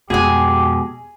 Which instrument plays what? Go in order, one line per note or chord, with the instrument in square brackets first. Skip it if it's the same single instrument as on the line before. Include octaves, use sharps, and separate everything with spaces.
[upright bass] F2 [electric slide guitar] B2 G#3 [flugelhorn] G4 [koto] G#4 G#5